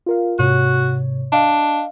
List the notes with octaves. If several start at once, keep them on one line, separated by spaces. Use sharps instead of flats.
F4 A#4 F5
G#2 C3 F#4 C#5
D4 D#5 F5